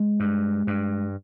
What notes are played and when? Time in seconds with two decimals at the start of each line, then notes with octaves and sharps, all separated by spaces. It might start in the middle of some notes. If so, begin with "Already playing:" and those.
Already playing: G#3
0.20 G2
0.67 G2